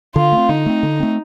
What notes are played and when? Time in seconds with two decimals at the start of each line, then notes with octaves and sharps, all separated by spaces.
0.16 D3 F4
0.32 A3 C4
0.49 D3 D#4
0.66 A3 C4
0.83 D3
1.00 A3 C4